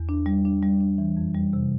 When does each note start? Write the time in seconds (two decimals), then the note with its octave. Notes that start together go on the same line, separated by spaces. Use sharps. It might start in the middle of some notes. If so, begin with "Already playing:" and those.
Already playing: E2
0.09 D4
0.26 G3
0.45 D4
0.63 G3
0.81 D4
0.98 E3
1.17 F2
1.35 G3
1.53 C3